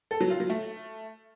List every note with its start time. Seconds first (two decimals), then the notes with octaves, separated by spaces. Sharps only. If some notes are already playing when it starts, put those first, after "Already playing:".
0.11 A4
0.21 F#3
0.30 F4
0.40 F#3
0.50 A3